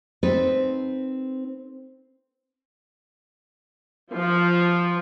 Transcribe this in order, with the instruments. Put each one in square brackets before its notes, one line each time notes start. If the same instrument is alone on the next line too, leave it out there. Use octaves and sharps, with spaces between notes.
[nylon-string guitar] C4 D#4 A4 B4
[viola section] F3